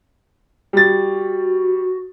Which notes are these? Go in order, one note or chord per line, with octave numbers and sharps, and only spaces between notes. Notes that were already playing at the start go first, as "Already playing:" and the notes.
G3 F#4 A6